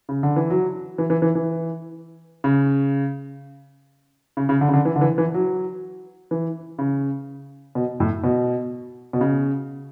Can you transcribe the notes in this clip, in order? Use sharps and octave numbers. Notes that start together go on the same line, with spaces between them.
C#3
D3
E3
F#3
E3
E3
E3
E3
C#3
C#3
C#3
D3
C#3
D3
E3
D3
E3
E3
F#3
E3
C#3
B2
A2
B2
B2
C#3